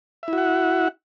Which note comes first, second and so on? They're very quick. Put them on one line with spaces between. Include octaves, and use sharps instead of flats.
E5 E4 F#4 F#5